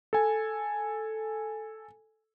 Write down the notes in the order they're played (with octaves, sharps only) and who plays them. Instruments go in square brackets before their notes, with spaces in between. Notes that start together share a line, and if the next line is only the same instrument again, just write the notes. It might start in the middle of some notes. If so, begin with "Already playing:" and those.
[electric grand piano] A4 G#5